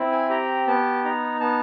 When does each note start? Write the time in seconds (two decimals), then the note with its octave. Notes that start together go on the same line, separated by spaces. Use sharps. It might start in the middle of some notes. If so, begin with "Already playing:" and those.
Already playing: C4 E4
0.11 G#5
0.29 G4 A#5
0.67 B3 A5
1.04 D#4 A#5
1.40 B3 A5